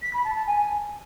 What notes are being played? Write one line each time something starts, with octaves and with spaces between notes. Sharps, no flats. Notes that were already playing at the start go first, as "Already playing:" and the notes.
B6
B5
A5
A5
G#5